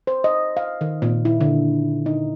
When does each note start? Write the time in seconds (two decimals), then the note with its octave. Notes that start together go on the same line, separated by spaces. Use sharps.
0.07 C5
0.24 D#5
0.57 F5
0.81 D#3
1.02 A#2
1.25 E4
1.41 D3
2.06 D#4